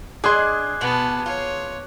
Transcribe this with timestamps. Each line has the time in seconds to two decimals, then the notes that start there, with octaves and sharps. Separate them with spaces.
0.24 D4 G#4 D#5 C6 D6 F#6 G#6
0.81 B2 B3 A5
1.26 F4 C#5